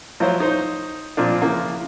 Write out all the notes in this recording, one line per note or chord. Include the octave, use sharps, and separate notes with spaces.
F3 F#3 E4 F4 C5
D#4 C5
A#2 F3 C4 D4
C#3 E3 F3 A#3